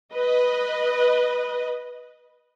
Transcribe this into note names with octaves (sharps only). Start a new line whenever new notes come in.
B4 D#5